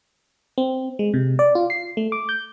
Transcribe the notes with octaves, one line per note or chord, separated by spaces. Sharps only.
C4
G#3
C3
D5
F4
C7
A3
D6
G6